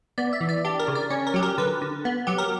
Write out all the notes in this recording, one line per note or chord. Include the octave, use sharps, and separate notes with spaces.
B3 D5
E5
E3
D5
D4 G4
A#4
C#3
D5
C#4 C#5
A#4
F#3 G4
A#4
D3 B4
D3
B3
F#3 G4
A#4